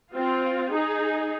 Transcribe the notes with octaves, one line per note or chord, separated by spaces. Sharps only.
C4 F4
D#4 G#4